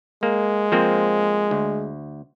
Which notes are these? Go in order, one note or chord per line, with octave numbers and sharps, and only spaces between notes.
G#3 A#3
F3 A#3 C4
D2